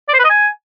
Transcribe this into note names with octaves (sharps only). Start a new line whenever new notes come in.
D5
C5
B4
D#5
G#5